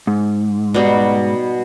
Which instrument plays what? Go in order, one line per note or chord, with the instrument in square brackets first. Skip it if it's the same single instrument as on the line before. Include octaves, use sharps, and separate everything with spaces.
[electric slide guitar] G#2
[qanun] B2 G3 D#4